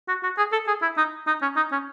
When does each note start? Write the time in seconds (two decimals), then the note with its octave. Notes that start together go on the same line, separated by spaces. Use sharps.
0.08 F#4
0.23 F#4
0.38 G#4
0.52 A4
0.67 G#4
0.82 E4
0.97 D#4
1.27 D#4
1.42 C#4
1.56 D#4
1.72 C#4